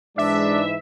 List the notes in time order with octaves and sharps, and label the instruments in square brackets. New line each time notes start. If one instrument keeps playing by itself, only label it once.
[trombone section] G#2 E3 D#4 [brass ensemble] G#3 D4 [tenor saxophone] D5 [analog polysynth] E5